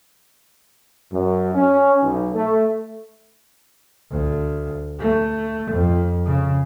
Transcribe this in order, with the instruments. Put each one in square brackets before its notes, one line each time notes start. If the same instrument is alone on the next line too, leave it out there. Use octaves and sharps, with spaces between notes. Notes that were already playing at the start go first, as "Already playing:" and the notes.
[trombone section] F#2
C#4
B1
A3
[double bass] D2
A3
F2
C#3